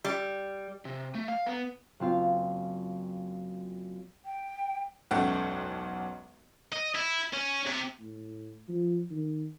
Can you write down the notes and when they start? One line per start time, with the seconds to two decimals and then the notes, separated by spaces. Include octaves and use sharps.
0.04 G3
0.85 C3
1.15 A3
1.28 F5
1.46 B3
2.00 F#1 C4 F4 F5
4.25 G5
5.11 E1 B1 F#2 A3 F#5 G5
6.72 D#5
6.95 E4
7.33 C#4
7.66 C3
8.00 A2
8.68 F3
9.11 D#3